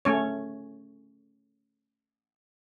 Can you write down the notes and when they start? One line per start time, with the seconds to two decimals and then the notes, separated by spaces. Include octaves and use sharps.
0.05 A3 C#4 C#5